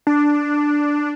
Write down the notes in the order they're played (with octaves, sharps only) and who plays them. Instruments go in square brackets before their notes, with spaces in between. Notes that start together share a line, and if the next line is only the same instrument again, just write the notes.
[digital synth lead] D4